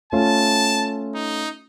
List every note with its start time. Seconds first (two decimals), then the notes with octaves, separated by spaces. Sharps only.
0.12 A3 C#4 F4 A5
1.15 D#4